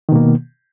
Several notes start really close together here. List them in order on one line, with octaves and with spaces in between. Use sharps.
D#3 B2 A#3